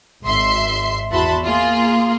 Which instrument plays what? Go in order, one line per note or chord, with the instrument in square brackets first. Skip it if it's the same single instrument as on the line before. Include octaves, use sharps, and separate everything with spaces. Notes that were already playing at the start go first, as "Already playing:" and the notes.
[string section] G#1 E5 C6 C7
E2 F#4 E5 A5 B5 C6
A#3 F4 G#4